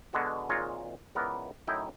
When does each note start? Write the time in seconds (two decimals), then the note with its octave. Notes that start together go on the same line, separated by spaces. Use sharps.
0.13 B2 D3 G#3 B3 F#4
0.49 G#1 A#2 G#3 F4 C#5 A#5
1.15 C#2 E3 B3 A#4 D5
1.67 F#2 A2 D#4 E4 G5